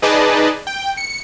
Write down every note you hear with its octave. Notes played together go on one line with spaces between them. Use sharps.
D#4 G#4 B4 D5 D#5 A5
G5
C#7